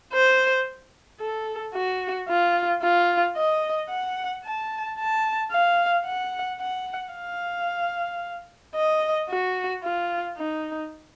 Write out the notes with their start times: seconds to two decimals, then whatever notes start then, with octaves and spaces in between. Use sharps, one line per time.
0.13 C5
1.21 A4
1.74 F#4
2.28 F4
2.83 F4
3.36 D#5
3.90 F#5
4.44 A5
4.98 A5
5.52 F5
6.05 F#5
6.60 F#5
7.14 F5
8.75 D#5
9.29 F#4
9.83 F4
10.38 D#4